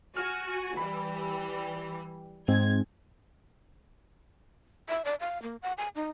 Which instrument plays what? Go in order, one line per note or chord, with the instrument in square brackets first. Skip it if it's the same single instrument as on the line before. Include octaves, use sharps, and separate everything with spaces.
[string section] F#4 G#5 [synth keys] F6
[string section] E3 G3 [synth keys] B5
[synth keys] G#2 G#3 C4 [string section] G#6
[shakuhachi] E5
D5
F5
A#3
F#5
G#5
D#4